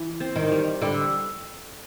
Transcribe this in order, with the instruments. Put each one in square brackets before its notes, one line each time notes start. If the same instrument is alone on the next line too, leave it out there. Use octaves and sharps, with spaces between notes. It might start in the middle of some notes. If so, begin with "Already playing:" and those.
Already playing: [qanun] E3
C4
[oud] D#3
[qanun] G3
[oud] D3 [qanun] G3